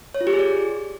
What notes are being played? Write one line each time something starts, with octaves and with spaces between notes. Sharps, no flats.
C#5
F4
G4
G#4
D5